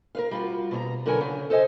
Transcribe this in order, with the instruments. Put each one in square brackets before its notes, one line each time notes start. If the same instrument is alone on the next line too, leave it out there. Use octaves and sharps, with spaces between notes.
[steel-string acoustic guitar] A#4 B4 F5
G3 F4 F#4
B2 C#5 A#5
D3 F#3 A#4 B4 F#5 G#5
C#3
A4 C5 D#5 G#5